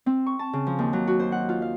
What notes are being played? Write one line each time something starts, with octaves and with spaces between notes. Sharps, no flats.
C4
C#6
A5
C#3
F3
D#2
F#3
F#4
C5
F#5
F4
F5